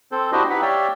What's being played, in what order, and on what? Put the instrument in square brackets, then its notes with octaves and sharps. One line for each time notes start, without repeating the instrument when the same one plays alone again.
[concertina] C4 A4 C5
D4 E4 F#4 G4 C5 D#5
D#4 E4 G4 B4 F#5 B5
G4 C#5 D5 E5 F5 G5